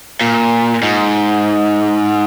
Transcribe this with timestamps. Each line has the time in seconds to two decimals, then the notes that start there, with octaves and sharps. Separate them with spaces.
0.21 A#2
0.83 G#2